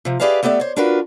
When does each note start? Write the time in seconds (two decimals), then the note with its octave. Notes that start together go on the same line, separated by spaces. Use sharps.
0.05 C3 F3
0.20 G4 G#4 B4 D5 E5 F5
0.43 A3 B3 G4 A4 D5 E5
0.60 C5 C#5
0.76 D4 F4 F#4 A#4 B4